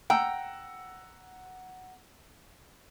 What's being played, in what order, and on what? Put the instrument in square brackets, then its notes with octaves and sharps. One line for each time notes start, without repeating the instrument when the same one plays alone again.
[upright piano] F#5 A#5 E6 [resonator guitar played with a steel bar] G5